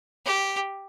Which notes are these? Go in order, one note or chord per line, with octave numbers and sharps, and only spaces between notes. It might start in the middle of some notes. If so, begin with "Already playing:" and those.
G4